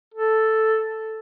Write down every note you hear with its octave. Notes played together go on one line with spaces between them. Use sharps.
A4